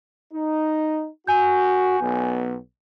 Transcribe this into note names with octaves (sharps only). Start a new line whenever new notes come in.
D#4
F#4 G#5 G6
B1 B3